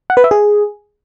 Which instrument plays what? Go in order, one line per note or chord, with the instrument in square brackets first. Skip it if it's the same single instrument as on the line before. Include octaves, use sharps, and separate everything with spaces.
[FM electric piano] F#5
B4
E5
G#4